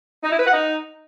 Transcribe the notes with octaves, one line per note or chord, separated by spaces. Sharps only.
D#4
E4
B4
F#5
D#4